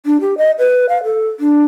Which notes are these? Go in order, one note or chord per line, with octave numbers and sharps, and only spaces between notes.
D4
G4
D#5
B4
F5
A4
D4